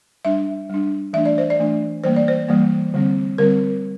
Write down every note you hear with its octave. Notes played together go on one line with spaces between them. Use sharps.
G3 D4 E5
G3 D4
E3 A3 D4 E5
D5
C5
D5
E3 A3 D4
E3 G3 A#3 C5
D5
C5
E3 G3 A#3
D3 G3 C4
D3 G3 C4 A#4